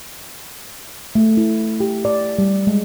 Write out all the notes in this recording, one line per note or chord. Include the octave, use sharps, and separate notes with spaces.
A3
E4
G4
D5
G3
G#3